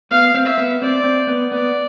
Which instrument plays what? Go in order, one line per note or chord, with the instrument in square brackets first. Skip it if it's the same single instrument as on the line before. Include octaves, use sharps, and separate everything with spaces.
[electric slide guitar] B3 [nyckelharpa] F5
[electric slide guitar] C4
[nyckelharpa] E5
[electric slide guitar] B3
[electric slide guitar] C4 [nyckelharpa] D5
[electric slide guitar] C4
B3
[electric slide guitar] B3 [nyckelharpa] D5